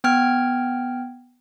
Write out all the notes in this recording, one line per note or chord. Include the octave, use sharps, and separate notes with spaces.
B3 G5 F6 G#6